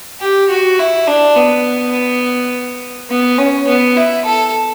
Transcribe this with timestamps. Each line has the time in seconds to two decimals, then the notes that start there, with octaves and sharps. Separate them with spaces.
0.21 G4
0.49 F#4
0.79 E4
1.07 D4
1.36 B3
3.10 B3
3.38 C#4
3.68 B3
3.97 E4
4.25 A4